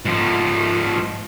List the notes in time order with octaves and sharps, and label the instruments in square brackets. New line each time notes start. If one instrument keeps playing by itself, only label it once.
[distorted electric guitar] G#2 F3